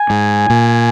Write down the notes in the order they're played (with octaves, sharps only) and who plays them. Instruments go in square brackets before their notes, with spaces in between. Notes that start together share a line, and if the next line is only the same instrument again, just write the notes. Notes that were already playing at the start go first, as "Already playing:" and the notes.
Already playing: [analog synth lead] G#5
[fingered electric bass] G#2
A#2